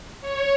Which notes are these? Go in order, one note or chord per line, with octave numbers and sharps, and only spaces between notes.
C#5